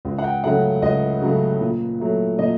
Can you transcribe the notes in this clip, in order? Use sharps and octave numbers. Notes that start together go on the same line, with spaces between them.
C#2
F#5
G5
C#3 F#3 A3 F#5
C#2 D#5
C#3 F#3 A3
A#2
F#3 A3
A#2 D#5